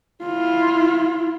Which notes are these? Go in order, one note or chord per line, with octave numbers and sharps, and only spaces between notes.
E4 F4